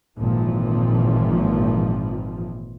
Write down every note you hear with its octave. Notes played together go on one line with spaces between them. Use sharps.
G#1 A#2 E3 F3